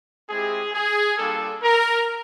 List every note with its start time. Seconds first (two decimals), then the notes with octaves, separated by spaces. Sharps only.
0.29 G#3 C4 E4 G4 G#4
0.74 G#4
1.18 G3 A#3 D4 F4 A4
1.63 A#4